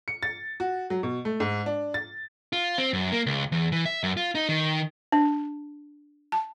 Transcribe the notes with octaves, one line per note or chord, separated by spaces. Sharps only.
C#7
A6
F#4
F#3
B2
A3
G#2
D4
A6
F4
C4
F#2
A#3
C#2
E2
E3
E5
F#2
F4
D#4
D#3
D4
A5